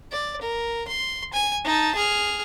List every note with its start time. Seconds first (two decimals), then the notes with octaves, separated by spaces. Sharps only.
0.12 D5
0.42 A#4
0.88 C6
1.33 G#5
1.65 D#4 A5
1.95 G#4 F6